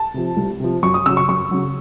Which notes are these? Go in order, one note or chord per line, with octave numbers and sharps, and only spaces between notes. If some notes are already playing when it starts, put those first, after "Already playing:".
Already playing: A5
C3 F3
C2
C3 F3
F#2 C#6
D#6
C#3 F#3 E6
C#6
F#2 C#6
C#3 F#3